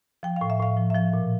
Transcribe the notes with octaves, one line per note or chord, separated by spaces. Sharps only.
F3 G5
A2 F5
E5
A2 F5
F3
E5
F3 F5
A#2